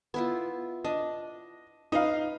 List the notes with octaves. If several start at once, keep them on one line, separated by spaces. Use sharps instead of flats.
B3 E4 F4
D4 D#5
D#4 B4 F5